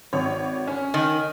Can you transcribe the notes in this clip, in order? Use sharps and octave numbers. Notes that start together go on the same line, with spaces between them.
G#1 C#5
C#4
D#3